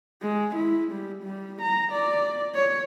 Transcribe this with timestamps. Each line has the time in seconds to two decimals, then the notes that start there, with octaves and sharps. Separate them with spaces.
0.22 G#3
0.56 E4
0.92 G3
1.23 G3
1.62 A#5
1.93 D5
2.54 C#5